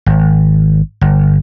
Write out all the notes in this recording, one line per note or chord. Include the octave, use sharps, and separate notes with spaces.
G#1
G1